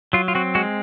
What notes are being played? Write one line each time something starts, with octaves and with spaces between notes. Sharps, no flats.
F#3 F4
F4
C4 F#4
G#3 F#4